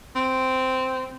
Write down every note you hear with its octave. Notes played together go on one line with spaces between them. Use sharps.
C4